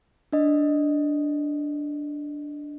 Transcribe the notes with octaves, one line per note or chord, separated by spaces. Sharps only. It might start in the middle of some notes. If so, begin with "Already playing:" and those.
D4 D#5